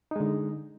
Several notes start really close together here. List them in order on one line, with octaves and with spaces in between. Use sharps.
D#4 G#3 D3